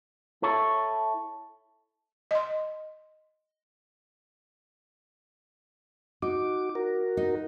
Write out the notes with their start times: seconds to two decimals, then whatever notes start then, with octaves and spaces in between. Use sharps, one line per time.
0.42 E4 A4 C#5
2.31 D#5 C6
6.22 D#4 F#4 D6
6.75 F#4 A#4
7.17 D#4